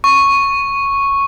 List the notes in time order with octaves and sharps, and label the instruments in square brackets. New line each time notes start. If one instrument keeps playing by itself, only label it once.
[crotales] C#6